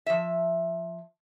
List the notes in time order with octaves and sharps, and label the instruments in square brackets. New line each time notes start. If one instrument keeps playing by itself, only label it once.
[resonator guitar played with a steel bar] F3 E5